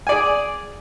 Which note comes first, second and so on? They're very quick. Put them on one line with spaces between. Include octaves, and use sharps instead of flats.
G#5 D5 G#4